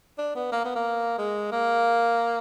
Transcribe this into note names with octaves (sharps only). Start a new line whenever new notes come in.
D4
B3
A#3
B3
A#3
G#3
A#3